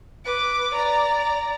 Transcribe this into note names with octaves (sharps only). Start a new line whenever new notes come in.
B4 D6
D5 A#5